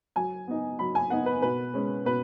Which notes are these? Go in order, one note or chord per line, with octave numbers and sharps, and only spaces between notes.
F#3 G#5
B3 D#4
F#3 B5
G#5
B3 D#4 F#5
B4
B2 B4
G#3 C#4
B2 B4